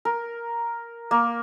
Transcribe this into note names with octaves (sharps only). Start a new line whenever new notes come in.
A#4
A#3